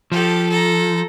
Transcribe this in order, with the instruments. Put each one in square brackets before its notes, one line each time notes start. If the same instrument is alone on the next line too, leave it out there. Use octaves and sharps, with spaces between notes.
[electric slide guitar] F3 [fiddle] G4 A4
[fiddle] A4 A#5